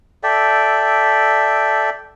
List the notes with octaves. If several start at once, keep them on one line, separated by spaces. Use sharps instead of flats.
A4 D5 E5 G5